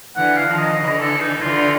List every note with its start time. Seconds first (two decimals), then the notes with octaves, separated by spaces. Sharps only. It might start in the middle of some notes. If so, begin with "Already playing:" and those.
0.16 D3 E3 F#5
0.37 F5
0.47 D#3 F3
0.58 D#5
0.78 D3 E3 D#5
1.00 A4
1.20 D#4
1.42 D3 E3 F4